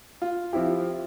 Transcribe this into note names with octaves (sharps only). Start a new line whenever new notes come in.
F4
F3 C4 E4 G4